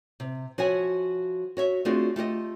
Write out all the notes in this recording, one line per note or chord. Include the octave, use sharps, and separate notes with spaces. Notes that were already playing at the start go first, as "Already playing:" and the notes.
C3
F3 F#4 C#5 E5 F#5 G#5
F#4 C#5 E5
A3 C4 D4 F4 F#4 G#4
A3 F4 G4 D#5